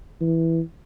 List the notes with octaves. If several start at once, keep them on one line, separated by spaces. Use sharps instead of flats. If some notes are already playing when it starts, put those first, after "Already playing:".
E3